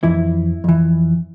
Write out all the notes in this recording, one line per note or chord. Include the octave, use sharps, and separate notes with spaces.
F2 E3 E4
F2 E3